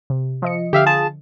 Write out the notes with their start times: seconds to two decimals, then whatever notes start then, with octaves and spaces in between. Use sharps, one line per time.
0.10 C3
0.42 F3 D#5 C#7
0.73 D3 G4 E5 F5
0.86 F4 G#4 A5